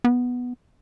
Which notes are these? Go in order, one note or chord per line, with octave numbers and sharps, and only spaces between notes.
B3